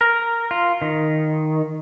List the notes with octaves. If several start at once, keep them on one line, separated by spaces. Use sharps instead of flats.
A#4
F4
D#3